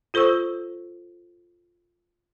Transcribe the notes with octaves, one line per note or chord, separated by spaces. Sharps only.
F4 A4 C5 C#6 E6